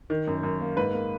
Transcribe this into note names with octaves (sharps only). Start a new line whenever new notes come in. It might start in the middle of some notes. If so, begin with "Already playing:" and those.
D#3
F#2
F#2
A#3
G#2 B4
A#3